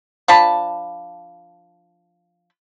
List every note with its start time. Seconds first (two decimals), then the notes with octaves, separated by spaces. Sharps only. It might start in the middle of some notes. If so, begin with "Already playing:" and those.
0.28 F3 D4 A5 B5